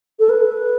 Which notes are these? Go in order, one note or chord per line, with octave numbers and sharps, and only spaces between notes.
A4
B4